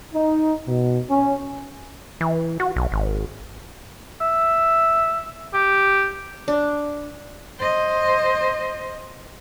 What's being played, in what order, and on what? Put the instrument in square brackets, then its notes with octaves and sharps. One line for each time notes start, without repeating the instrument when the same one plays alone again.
[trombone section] D#4
B2
C#4
[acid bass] E3
F#4
B1
G#1
[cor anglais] E5
G4
[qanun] D4
[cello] C5 D#5